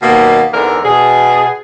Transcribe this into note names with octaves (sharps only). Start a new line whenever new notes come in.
D#2 B2 A#3
E2 G#2 D3 C4 A#4
B2 G#4